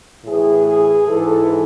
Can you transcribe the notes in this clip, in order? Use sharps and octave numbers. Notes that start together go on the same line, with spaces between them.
A2 E3 G#4
G#4
G#2 E3 A4